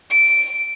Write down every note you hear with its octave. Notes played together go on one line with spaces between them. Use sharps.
D7